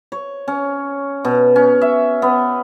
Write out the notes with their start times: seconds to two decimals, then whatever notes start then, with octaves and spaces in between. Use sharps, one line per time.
0.12 C#5
0.48 C#4
1.25 B2
1.56 C#4
1.81 E5
2.22 B3